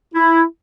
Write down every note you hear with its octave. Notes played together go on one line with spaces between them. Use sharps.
E4